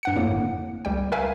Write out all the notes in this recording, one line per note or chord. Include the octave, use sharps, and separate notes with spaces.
G2 F#5 C#7
F2 A2 A#3
G1
C#2 G3 G5
A#4 B4 E5 F5 G#5